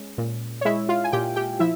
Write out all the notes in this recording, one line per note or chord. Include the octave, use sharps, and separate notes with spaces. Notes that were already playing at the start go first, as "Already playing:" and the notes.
Already playing: G#3 C#4
A#2
C#5
G#3 E4 E5
F4 F5
G#5
A#2 G4 G5
G4 G5
F3 E4 E5